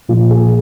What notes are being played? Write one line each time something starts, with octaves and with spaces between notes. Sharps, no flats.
A#2 F3 A#3 F4
G#4